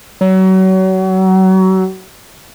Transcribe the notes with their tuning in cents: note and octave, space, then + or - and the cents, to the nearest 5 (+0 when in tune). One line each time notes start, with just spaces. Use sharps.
F#3 +30